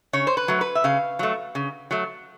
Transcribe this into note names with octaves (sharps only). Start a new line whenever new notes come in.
C#3 C#5
C5
B4
F#3 A3
B4
E5
C#3 F5
F#3 A3
C#3
F#3 A3